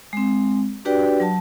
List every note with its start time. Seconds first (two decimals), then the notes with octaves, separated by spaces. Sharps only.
0.13 G#3 C4
0.85 D4 F#4 G4 B4 D5 G5
1.20 F#3 A5